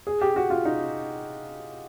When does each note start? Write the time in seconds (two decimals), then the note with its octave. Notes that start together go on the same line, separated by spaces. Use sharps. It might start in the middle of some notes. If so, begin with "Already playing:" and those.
0.07 G#4
0.21 G4
0.36 F#4
0.50 F4
0.65 D#4